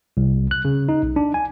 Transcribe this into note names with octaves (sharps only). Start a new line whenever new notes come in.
C2
F#6
C#3
D#4
B1
D4
G#5